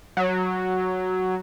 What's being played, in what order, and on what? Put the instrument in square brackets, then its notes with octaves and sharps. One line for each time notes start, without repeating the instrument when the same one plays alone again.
[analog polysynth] F#3